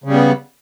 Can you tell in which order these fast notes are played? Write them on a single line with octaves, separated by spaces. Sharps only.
C#3 G3 B3